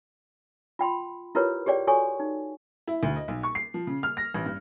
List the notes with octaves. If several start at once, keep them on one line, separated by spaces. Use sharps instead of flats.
F4 G5 B5 C6
E4 F4 G4 A#4 B4 C#5
G4 G#4 C#5 D5 G5
F#4 A4 C#5 G#5 C#6
D#4
E4
D2
D#5
B1
C#6
C7
F3
C#3
F6
A#6
A1
G2